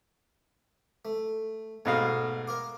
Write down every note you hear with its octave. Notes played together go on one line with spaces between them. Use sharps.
A3
G#2 B2 A3 F5
A#4 F5 D6